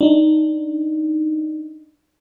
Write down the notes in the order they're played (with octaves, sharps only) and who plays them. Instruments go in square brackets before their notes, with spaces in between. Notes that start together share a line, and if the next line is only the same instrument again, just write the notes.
[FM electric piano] D4 D#4